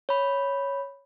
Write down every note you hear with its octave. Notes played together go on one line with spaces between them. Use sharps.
C#5 B5